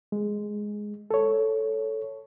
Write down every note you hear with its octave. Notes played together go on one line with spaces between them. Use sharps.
G#3
A4 C#5